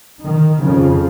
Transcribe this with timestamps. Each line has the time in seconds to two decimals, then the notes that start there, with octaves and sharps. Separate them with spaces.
0.24 D#3
0.62 F2 C#3 F3